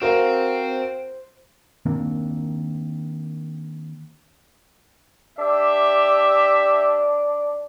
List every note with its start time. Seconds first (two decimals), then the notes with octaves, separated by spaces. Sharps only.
0.01 C4 F#4 A#4 C5 F5
1.86 D#3 A#3 C4 D4
5.39 D4 G4 E5